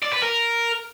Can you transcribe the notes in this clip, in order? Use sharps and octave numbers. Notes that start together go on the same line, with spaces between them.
D5
B4
A#4